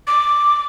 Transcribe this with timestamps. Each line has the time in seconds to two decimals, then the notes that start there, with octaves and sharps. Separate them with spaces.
0.07 D6